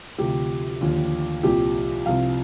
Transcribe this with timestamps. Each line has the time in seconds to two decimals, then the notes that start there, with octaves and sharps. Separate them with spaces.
0.18 D2 C3 F3 G4
0.81 D#2 D3 F3
1.43 C2 A#2 F3 G4
2.06 C2 C3 F3 F5